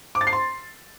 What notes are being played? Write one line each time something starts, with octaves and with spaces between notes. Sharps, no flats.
D6
A6
C7
C6